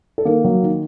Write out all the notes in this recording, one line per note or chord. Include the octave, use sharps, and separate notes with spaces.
A4
D#3 A#3 A#4
F#3
D#3